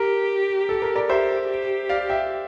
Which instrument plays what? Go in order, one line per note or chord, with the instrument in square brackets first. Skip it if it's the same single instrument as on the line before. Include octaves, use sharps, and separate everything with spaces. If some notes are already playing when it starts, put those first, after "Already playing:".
Already playing: [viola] G4 [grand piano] A#4
[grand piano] A4
A#4
A#4 D5
[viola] G4 [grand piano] C5 E5
[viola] G4
[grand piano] D5 F5
E5 G5